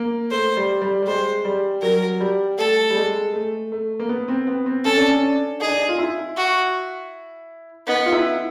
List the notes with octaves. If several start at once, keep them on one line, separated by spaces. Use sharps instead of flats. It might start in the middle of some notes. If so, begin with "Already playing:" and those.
Already playing: A#3
A3 C5
G3
G3
G3
G#3 C5
G3
F#3 A#4
G3
A3 A4
G3
G#3
A3
A3
A#3
B3
C4
B3
C4
C#4 A4
D4
C#4
D4
D#4 G#4
D4
D#4
F4
E4
F#4
B3 D#4
F4
E4